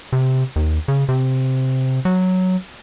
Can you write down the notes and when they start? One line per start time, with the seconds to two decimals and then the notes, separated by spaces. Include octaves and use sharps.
0.13 C3
0.56 D#2
0.88 C#3
1.09 C3
2.05 F#3